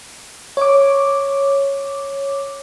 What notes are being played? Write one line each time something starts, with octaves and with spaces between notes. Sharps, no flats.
C#5 D6